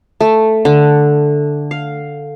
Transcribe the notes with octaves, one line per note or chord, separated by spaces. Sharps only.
A3
D3
F5